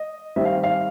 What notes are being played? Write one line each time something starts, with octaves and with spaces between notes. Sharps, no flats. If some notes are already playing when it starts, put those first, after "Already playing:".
Already playing: D#5
D#3 G3 C4 E5
F5
F5